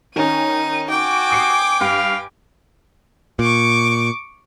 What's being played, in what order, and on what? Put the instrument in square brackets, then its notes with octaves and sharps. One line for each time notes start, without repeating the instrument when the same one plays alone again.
[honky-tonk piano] D#3 C#4 [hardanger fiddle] D#4 [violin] D#7
[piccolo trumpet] F#4 [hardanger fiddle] G5 [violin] G#5 D6
[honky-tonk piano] D#6 C7 C#7
[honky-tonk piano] G2 [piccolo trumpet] F5
[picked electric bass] A#2 [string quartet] C#6 D6